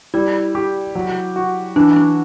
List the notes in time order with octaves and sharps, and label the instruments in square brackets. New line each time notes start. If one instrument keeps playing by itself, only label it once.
[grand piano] G3 [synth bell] E4
[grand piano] G4
F#3
F#4
[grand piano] E3 [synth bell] D4
[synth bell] D4